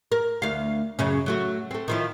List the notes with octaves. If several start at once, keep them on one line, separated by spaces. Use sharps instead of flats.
A#4
D2 F5
F#2 C#3 C#4
F#3 A3 F#4
A3 C4
D#3 F3 E4